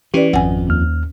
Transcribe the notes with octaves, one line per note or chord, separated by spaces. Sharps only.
E3 C#4 G4 B4 D5
G#1 F2 F#5 G#5
D#2 F6